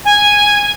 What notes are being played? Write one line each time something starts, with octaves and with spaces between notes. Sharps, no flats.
G#5